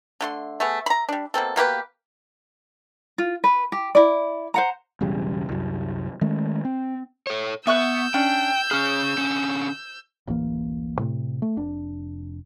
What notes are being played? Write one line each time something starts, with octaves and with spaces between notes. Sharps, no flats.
D3 A3 C6
A3 B3 G#4
A#5 B5
G3 D4
B2 A#3 C4 A4
B2 A#3 G4 B4
F4
B4
G4
E4 D5
C5 F#5 A#5
E1 B1 C#3 G3
C2 F#2
D#3 G#3 A3 C#4
C4
A4 C#5
B3 E5 C#6 E6 F#6 G6
C#4 D4 G5
C#4 G#4 F6
D3 C#4
D1 A1 E3 A#3
A2 C3
A3
F1 D4